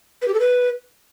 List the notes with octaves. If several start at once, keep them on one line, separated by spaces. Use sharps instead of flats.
B4
G4
A4
B4